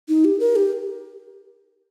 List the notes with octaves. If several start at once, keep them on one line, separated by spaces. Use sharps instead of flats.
D#4
G4
A#4
G4